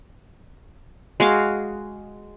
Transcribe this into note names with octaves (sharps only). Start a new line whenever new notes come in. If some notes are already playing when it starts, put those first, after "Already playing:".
G#3 F#4 F5 D6